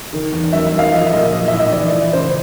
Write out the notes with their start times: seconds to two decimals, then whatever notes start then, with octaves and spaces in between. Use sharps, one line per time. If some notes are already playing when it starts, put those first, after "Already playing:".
0.13 D#3
0.32 E2
0.52 F#2 E5
0.66 E5
0.72 F#2
0.79 F5
0.92 F3 D#5
1.06 E5
1.12 A#2 D#5
1.33 F3
1.48 E5
1.53 A2
1.60 D#5
1.72 E3 D5
1.92 E3
2.13 C#3 C5